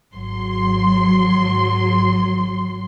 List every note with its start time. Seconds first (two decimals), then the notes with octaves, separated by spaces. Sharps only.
0.13 G#1 F#3 C6